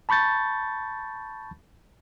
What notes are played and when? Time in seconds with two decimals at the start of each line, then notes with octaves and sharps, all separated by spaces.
0.09 A5 B5 C#6 G6 A6